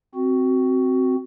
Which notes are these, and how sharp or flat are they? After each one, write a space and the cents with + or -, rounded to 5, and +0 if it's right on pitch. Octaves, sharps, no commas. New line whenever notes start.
C4 +0 F#4 +10